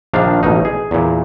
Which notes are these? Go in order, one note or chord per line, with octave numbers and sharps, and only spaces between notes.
A#1 D#3 F3 D4 F5
A1 B2 D#4
G#4
E2 A#2